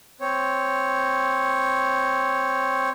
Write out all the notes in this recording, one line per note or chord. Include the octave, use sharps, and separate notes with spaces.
C4 C#5